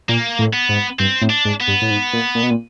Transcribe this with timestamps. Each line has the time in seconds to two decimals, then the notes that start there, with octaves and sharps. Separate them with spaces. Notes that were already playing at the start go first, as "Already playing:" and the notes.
0.09 A#2 A#3
0.39 A2
0.53 B3
0.69 G#2
0.99 G2 C4
1.22 A2
1.30 D4
1.45 G#2
1.60 B3
1.68 G2
1.82 A2
1.91 G#2
2.13 A#2
2.35 A#2
2.43 B2
2.50 A#2